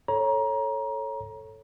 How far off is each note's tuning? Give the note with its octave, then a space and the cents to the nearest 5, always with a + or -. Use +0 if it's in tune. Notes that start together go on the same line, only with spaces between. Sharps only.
A4 +0 C#5 -15 A#5 +25